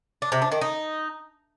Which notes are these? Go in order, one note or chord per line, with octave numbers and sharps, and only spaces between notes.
D4
C3
D4
D#3
D#4